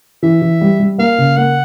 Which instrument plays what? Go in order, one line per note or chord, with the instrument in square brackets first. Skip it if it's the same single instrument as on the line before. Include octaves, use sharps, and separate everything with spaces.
[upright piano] E3 [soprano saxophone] E5
[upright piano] E3
G3
G3
[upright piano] A#3 [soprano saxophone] F5
[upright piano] C#3
[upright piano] A#3 [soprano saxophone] F#5